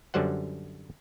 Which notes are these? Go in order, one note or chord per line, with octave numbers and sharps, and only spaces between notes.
F#2 D3 F#3 G3 C5 F#5